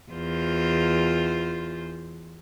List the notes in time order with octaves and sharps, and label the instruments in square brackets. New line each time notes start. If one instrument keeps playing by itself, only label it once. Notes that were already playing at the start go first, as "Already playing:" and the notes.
[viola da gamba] E2 F4 C5